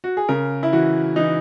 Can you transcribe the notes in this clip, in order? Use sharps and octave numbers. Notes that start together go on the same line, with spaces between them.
F#4
G#4
C#3 A#4
E4
E3 F#4
E3 D#4